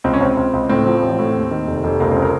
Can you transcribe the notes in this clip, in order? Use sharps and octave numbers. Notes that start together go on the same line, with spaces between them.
C#2 C4
C#4
C#2 C4
C#2
C#2
A2 C4
F3
A1
A2
D#2
D#3
F1
F1
C#2 A#3
C4
C#3
A#4